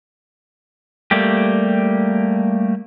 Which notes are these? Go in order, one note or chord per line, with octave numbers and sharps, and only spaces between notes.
G3 A3 A#3 G4